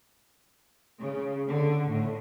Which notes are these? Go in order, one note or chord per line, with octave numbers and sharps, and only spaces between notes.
C#3
D3
A2